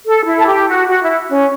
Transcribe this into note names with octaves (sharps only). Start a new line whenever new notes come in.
A4
E4
A4
G4
F#4
F#4
E4
C#4